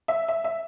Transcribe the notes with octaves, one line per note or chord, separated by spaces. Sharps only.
E5
E5
E5